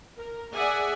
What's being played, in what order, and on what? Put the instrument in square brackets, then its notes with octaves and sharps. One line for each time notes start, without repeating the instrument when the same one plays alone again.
[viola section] A#4
G#4 D5 E5 F#5 G#5